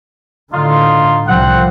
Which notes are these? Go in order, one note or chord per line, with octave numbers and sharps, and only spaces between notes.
A2 D3 D#4 F4
C2 F3 C4 F#5